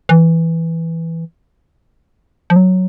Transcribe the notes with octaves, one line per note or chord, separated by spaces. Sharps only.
E3
F3
F#3